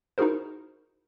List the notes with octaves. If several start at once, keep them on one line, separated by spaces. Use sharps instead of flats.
D#4 E4 F#4 G#4 A#4 C5